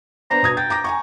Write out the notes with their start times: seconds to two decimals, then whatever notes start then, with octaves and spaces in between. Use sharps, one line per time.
0.31 B3 D4 C5 A#5
0.43 B2 D#6 G#6
0.57 G5 A6
0.70 A#5 D6 A#6
0.84 G#5 A#5 C#6